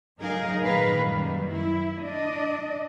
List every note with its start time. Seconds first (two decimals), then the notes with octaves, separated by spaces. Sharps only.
0.19 F#3 D#4 G#4 A#4 F5
0.61 A#2 D#3 A#4 B4 F5
1.02 F#2 D#3 G3
1.51 E4
2.01 D4 D5 D#5